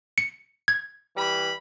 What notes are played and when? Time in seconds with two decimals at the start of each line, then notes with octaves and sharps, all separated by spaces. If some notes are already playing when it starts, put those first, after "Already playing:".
0.18 C#7
0.68 G#6
1.16 E3 G3 B5